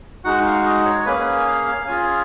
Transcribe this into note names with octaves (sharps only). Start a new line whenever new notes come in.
G#3 D#4 F#4 F#5
F5
D#5
C#5
C#5
A#3 C#4 G#4 B4
F5
F5
C#4 F4 G#4 G#5